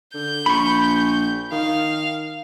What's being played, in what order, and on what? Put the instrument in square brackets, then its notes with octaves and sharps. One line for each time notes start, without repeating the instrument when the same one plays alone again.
[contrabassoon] D3 [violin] G6
[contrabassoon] A#1 [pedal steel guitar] B5 C#6
[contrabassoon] D#3 [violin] F5